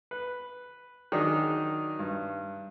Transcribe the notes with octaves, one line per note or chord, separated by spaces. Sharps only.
B4
D#3 F#3 D4 D#4 G#4
G2